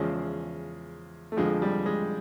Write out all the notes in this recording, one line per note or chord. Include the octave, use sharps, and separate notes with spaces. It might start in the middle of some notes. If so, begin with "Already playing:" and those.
Already playing: E2 C#3 F3 G#3
A3
F2 D3 F3 G#3
G3
G#3